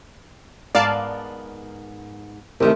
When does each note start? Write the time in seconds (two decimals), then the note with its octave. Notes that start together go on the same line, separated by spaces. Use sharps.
0.75 G#2 B3 A#4 D5 F5 A5
2.60 C2 C3 D#3 A3